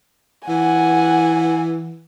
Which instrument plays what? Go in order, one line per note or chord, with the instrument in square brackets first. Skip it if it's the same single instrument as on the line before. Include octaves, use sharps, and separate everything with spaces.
[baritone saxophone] E3 [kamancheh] F#5 G#5